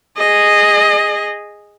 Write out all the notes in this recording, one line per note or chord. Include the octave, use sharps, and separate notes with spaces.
G#4 D#5